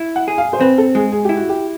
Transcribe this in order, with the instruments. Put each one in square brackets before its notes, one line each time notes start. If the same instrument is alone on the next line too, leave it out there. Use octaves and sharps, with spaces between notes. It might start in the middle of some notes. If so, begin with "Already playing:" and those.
Already playing: [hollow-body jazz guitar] E4
[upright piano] F#5
[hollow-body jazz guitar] G#4
[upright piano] F5
C5
[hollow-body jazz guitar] C4 [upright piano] B4
[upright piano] A4
[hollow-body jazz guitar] G#3 [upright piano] G#4
[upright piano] G#4
[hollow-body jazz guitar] E4 [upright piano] G4
[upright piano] F#4
G4